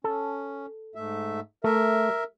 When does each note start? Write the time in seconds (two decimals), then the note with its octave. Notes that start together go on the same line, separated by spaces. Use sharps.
0.04 C#4 A4
0.95 G#2 A3 E5
1.64 A3 A#4 E5